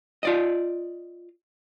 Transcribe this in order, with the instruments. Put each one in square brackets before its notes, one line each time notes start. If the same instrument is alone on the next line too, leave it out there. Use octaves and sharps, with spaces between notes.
[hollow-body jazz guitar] F4 D5 D#5